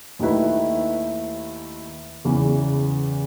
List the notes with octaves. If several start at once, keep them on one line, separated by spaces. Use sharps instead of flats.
D#2 D#3 A3 E4 B4
E2 C#3 E3